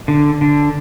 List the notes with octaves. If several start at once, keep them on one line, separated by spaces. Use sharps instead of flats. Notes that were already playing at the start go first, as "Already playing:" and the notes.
D3
D3